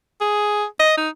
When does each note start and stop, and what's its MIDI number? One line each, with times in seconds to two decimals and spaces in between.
0.21 0.65 68
0.80 0.93 75
0.97 1.09 63